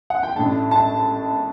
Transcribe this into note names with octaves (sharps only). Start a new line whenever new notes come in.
F#5
G5
A1 A2 A3 D4 A5
A5